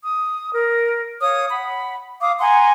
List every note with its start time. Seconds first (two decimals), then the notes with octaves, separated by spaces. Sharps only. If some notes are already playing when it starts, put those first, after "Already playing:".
0.02 D#6
0.55 A#4
1.21 C#5 F5 D#6
1.50 F#5 B5
2.21 F5 D6 D#6
2.39 F#5 G#5 A#5 C6